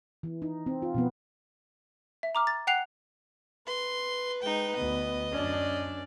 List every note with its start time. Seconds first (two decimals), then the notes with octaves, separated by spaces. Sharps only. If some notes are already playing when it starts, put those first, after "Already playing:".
0.23 E3
0.42 D#4
0.66 C4
0.82 F4
0.95 B2 F3 B3
2.23 E5
2.35 A#5 D6 F6
2.47 A6
2.67 F#5 G5 F#6 C7 F7
3.67 B4 C6
4.42 G#3 D#4 G5
4.76 D2 B3 D#5
5.32 F#2 C#4 D4 D5